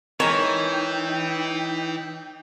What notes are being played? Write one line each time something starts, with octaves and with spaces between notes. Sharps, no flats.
E3 G#3 D#4 A#4 C#5 G5